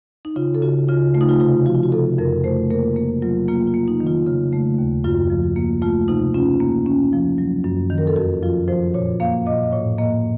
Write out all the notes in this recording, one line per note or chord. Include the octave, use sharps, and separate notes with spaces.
D#4
C#3 F4
A4
C#3 F#4
C#3 F4
A3 F4
D#4
F4
C3 F4
F3 F#4
F4
F#4
C3 A4
F2 A#4
A3 C5
A#3 A#4
A#3
F#3 F4
A#3 F4
F4
A#3
D#4
D#3
F4
C#3
A3
D#2
F#2 F4
F3
A#3
A3 F4
C3 D#4
C#4 F4
A#3
C#4
F3
F#3
F#2
D#3
A#4
A4
F2 F#4
F3 F4
F3 C5
A#2 C#5
A#3 F5
A#2 D#5
D#5
A2 C#5
A#3 D#5